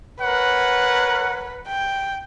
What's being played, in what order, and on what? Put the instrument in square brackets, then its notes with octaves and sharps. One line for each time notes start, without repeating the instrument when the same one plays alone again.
[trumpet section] A#4 C#5 F#5 [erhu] B4
[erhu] G5